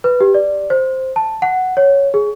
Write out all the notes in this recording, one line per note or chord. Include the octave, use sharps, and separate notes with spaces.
B4
G4
D5
C5
A5
F#5
C#5
G#4